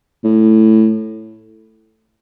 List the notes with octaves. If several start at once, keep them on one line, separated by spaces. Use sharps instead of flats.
A2